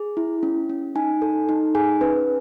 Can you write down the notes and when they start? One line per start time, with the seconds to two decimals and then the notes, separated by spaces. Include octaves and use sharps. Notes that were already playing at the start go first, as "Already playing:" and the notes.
Already playing: G#4
0.17 E4
0.43 C#4
0.70 C#4
0.95 D#4 G#5
1.22 A4
1.49 D#4
1.75 G#4 G#5
2.01 C#4 B4